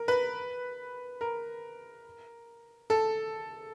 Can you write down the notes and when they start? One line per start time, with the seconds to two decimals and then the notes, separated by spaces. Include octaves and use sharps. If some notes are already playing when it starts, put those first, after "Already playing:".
Already playing: A#4
0.08 B4
1.21 A#4
2.90 A4